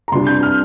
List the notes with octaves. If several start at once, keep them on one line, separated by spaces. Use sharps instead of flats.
A#5
C2 C3 G3 D4 C6
G6
F6